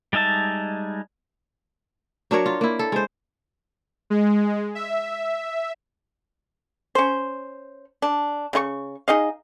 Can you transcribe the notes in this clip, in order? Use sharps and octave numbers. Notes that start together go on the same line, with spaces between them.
G3 G#3 D#4 E5 A5
F#3 D4 A#4 C#5
F4
A#3 E4
A4
G#3 C5
G#3
E5
C#4 C5
D4
C#3 E4 C#6
D#4 G#4 D#5 F5